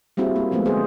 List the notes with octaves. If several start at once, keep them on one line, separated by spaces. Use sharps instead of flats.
G3 A#3 C4 E4 F#4 G#4
A#3
F3 G#3 A3 B3 C4
D3 G#4 C5